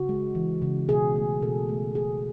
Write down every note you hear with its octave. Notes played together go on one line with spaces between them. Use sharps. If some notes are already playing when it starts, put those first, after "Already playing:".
Already playing: C#3 F#4
G#3
E3
C#3
B2 G#4
A3
B2 A4
A3
A3 G#4